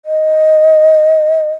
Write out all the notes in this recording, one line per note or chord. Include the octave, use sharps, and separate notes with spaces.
D#5